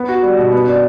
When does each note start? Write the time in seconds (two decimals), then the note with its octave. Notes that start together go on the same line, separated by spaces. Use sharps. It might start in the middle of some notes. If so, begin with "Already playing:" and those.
Already playing: B3
0.09 F#4
0.23 G3
0.39 B2
0.52 B3
0.67 D4